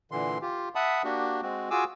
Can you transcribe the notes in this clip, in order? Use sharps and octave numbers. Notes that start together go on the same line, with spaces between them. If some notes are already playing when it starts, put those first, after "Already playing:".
A#2 D3 E3 C6
F4 G4
E5 F#5 A5 B5 D#6
A#3 D4 F#4 G4
G#3 C4 F#4
F4 F#4 G#4 G#5 D6 E6